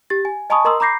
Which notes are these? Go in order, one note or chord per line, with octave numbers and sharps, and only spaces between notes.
G4 A6
G#5
D#5 G#5 A5 B5 C#6 D#6
A#4 D#5 A#5 C6 D#6 E6
A#5 B5 D6 G6 A#6 C7